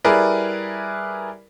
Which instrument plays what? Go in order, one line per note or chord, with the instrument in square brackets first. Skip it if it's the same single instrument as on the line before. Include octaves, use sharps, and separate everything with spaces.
[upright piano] G3 E4 G#4 A#4 B4 D5